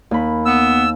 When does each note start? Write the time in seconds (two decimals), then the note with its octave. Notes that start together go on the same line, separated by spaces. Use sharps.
0.11 D#2 B5
0.45 B3 E6